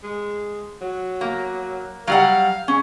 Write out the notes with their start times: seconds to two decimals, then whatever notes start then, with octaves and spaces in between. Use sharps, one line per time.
0.03 G#3
0.81 F#3
1.21 A#3
2.07 F#3 G3 F5 F#5
2.68 G#3 C#4